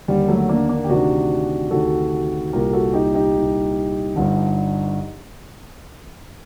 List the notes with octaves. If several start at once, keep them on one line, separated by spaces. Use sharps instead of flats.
D#2 D3 G3
F#3 A3
A#3 D4
A#3 D4
G4
D2 C3 D#3 D4 F#4
D2 C3 D#3 F#4 A4
C2 A#2 G4 A#4
F#4 A4
D#4 G4
D#4 G4
C2 A#2
G1 G2 D3